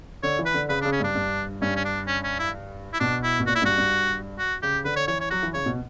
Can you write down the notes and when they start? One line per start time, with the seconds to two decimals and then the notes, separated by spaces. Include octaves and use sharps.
0.23 D3 C#5
0.39 E3
0.46 B4
0.54 D3
0.69 C#3 B4
0.82 D4
0.85 C#3
0.92 C#4
1.00 G2 D4
1.15 G2
1.62 G2 C#4
1.76 C#4
1.85 D4
2.07 C#4
2.24 C#4
2.39 E4
2.94 E4
3.00 B2 D4
3.24 E4
3.40 B2
3.47 A#2 F#4
3.56 E4
3.62 G2 F#4
3.78 G2
4.39 F#4
4.63 C#3 G4
4.85 D3 B4
4.97 C#5
5.08 E3 C#5
5.20 C#5
5.31 F#3 F#4
5.43 E3
5.54 C#3 C#5
5.66 B2